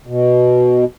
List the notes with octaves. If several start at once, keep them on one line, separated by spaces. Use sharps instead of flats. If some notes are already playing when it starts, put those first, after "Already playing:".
B2